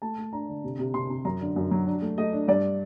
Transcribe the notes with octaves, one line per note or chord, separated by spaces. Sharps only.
A3 A5
A3
D4 A#5
D3
C3
C3
C3 C6
C3
F#2 A#5
D3
F#2
F#3
D4
A3
A3 D#5
D4
G2 D5